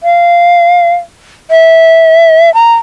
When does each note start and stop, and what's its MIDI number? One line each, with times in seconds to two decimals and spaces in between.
0.03 0.93 77
1.51 2.52 76
2.54 2.74 82